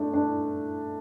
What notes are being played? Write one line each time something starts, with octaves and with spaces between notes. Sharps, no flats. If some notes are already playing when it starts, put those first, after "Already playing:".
Already playing: A3 D4
D4